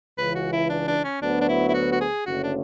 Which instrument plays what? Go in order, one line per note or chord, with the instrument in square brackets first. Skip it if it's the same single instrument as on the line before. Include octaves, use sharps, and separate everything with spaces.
[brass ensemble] C#2 C#3 E3 [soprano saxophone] B4
[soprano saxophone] F#4
E4
D4
D4
C#4
[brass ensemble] D2 D3 F#3 B3 [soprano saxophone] D4
[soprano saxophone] D4
E4
E4
F#4
F#4
G#4
[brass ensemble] F#1 F#2 D3 A3 C#4 [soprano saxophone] F#4
[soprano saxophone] D4